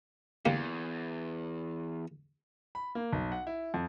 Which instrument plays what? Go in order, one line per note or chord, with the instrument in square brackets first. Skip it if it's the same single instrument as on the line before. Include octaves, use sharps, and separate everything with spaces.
[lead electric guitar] E2 [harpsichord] D3 A#3 G4
[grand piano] B5
A#3
B1
F#5
E4
F2